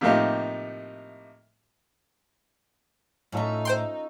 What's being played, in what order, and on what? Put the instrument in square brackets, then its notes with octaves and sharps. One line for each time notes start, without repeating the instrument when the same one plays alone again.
[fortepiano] A2 C3 F3 A#3 D#4 G4
[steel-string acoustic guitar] A2 E5 [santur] C#4 F4 A4 [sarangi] D#4
[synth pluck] C5 G5 C6